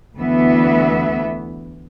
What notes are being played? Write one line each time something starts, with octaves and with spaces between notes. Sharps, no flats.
D2 E3 B3 E5